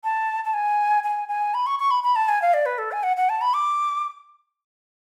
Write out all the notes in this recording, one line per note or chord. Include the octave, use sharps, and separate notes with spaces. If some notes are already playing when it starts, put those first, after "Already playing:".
A5
A5
G#5
G#5
G#5
B5
C#6
C#6
B5
B5
A5
G#5
F5
D5
B4
A4
G#5
F#5
F#5
A5
B5
D6